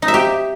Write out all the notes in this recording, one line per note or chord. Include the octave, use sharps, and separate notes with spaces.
D#4
E5
G4